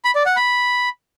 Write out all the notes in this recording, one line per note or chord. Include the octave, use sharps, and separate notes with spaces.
B5
D5
F#5
B5